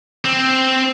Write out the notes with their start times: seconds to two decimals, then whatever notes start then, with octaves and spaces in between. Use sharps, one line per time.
0.25 C4